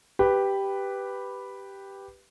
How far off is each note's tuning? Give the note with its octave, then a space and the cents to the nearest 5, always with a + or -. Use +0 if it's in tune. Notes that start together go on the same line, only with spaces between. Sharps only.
G4 +0 B4 +0